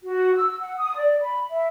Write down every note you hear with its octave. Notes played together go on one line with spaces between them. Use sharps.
F#4
E6
F#5
D#6
D5
B5
E5